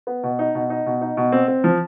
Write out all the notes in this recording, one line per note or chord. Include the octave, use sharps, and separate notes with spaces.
B3
B2
D#4
B2
D#4
B2
D#4
B2
C4
C4
F3